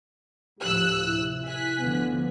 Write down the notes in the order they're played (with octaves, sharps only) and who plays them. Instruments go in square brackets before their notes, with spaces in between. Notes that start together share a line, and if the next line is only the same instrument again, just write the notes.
[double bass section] D2 A2 F3 [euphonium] G4 [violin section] E6 F#6
[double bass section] C3 [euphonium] E4
[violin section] G#5 F#6 B6
[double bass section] D2 D3 F3 [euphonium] B3